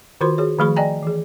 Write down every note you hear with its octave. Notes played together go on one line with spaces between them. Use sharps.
D#3 F4 F#4 A#4 C5 C6
F#4 G#4 C#5
D#3 F3 A3 G#4 B5 C#6
D5 D#5 G5 G#5 A#5
E3 G#4